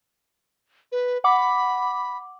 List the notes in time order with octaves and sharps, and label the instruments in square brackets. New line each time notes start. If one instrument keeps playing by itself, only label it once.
[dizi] B4
[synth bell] F#5 D6 [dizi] B5